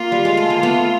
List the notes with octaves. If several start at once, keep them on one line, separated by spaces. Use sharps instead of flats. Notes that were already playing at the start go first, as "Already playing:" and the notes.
Already playing: A#3 F4
G3
G#3
A3
A#3
A3 B3